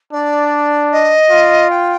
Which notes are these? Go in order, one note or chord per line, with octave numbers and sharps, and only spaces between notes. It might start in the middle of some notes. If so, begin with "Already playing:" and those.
D4 D5
D#5
F4
G5